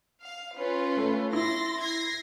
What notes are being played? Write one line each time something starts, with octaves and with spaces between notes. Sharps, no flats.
F5
C#4 F4 B4
A3
E4 C6 A6 A#6
G#6 A#6 C7